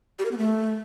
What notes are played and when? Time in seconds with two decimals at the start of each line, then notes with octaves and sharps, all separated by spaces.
0.19 G4
0.25 A#4
0.31 B3
0.38 A3